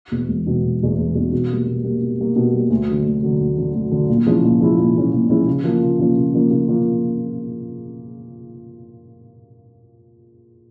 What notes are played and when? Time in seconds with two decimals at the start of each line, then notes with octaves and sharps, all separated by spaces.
0.12 E2 B2
0.28 E1
0.47 E2 B2
0.63 E1
0.80 E2 B2
0.98 E1
1.15 E2 B2
1.32 B2
1.50 G3 A#3
1.66 B2
1.84 G3 A#3
2.01 B2
2.19 G3 A#3
2.36 B2
2.53 G3 A#3
2.70 D2
2.88 D3 F#3
3.05 D2
3.23 D3 F#3
3.40 D2
3.58 D3 F#3
3.74 D2
3.91 D3 F#3
4.09 A#2
4.26 F3 G#3 C#4 E4
4.44 A#2
4.60 F3 G#3 C#4 E4
4.78 A#2
4.96 F3 G#3 C#4 E4
5.13 A#2
5.29 F3 G#3 C#4 E4
5.48 C#3
5.64 F3 A#3 C#4 F4
5.82 C#3
5.99 F3 A#3 C#4 F4
6.17 C#3
6.34 F3 A#3 C#4 F4
6.50 C#3
6.68 F3 A#3 C#4 F4